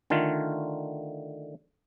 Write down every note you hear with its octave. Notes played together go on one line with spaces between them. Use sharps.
D3 D#3 A3 F4